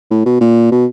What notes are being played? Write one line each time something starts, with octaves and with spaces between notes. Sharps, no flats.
A2
B2
A#2
B2